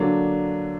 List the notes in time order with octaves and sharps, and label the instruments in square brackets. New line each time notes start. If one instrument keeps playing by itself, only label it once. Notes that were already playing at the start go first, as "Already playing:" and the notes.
Already playing: [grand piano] D3 F#3 A#3 D4